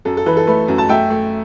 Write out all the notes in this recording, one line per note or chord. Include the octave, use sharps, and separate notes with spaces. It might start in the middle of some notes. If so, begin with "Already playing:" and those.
F#2 A4
A4
E3 B4
A4
A3 B4
F#2
A5
A3 E5 G5
A3